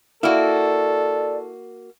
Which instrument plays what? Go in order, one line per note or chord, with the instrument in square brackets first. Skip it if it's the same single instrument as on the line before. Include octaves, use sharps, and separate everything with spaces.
[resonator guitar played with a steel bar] A#3 F#4 [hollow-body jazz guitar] E4 [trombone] A4 [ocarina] D5